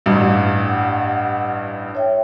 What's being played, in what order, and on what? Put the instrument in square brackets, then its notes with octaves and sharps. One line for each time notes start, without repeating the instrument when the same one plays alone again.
[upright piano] A1 G2
[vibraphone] F#5
C#5 E5 G5